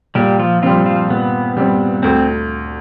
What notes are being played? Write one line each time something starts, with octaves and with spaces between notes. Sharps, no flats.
A#2 G3 G4
F3 F4
F3 G3 C4 F4
F3 F4
A#2 B3
G3 C4
D2 C4